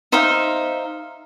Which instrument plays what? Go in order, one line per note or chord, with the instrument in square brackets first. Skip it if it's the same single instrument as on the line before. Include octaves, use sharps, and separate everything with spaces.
[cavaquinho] D#4 C5 E5 F5